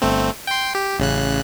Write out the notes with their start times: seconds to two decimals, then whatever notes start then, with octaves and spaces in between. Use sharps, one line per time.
0.02 G1 A3 C4
0.47 G5 C6
0.75 G4
0.99 A1 C#3 F#6